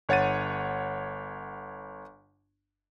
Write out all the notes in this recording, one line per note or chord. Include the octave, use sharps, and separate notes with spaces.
G1 C#5 F#5 A6 D#7